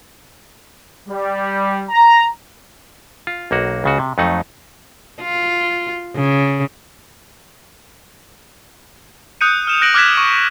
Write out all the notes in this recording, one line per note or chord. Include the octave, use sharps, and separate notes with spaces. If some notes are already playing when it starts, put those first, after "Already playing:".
G3
A#5
F4
B1 A#3 F#4
C#2 C#3 F#4
C3
F2 F#3 A3 D#4 F#5
F4
C#3
D#6 F#6 G6 C#7 D#7
F6 E7 F7
F#6 A#6 D7 F#7
D6 F6 F#6 G#6 B6 E7
C#6